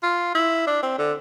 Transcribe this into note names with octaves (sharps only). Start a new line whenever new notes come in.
F4
E4
D4
C4
D3